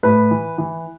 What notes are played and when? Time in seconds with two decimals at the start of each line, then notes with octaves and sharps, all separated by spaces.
0.03 A2 B4
0.31 E3
0.58 E3